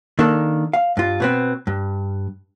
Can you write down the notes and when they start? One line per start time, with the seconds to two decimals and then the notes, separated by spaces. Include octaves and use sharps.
0.19 D#3 A#3 D4 A4
0.73 F5
0.97 G2 F4
1.20 B2 B3 C4
1.67 G2